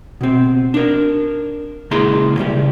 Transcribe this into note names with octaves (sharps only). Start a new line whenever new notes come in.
B2 C4
D4 A#4
C#2 A#2 E4 G#4 A#5 C6
C#3 G3 G4